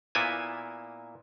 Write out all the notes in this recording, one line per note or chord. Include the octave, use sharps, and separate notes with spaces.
A#2 A#3 B3 E4 G#5